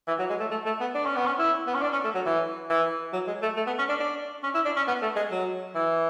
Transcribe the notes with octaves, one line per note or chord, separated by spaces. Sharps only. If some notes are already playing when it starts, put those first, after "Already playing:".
E3
F#3
G#3
A3
A3
A3
B3
D4
C#4
B3
C#4
E4
B3
C#4
D4
C#4
A3
F#3
E3
E3
F#3
G#3
A3
A3
B3
C#4
D4
D4
C#4
E4
D4
C#4
B3
A3
G#3
F#3
E3